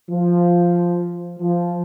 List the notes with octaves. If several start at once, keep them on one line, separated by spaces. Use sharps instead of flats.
F3
F3